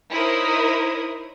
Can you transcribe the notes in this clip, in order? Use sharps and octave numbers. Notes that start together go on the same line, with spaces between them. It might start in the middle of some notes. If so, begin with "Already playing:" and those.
D#4 E4 A#4 C5 C#5 D#6